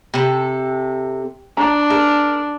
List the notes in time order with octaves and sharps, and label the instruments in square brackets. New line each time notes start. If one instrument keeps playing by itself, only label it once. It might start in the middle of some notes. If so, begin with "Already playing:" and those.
[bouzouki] C3 A4 [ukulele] G4
[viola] D4 [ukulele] A5 A#5
[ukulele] G#4 [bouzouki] A#4